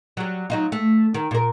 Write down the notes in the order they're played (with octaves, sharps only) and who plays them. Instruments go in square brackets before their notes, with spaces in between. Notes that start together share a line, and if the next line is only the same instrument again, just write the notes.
[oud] F#3 G3
F#3 D#4 F4
A3
D#3
A#2 A#4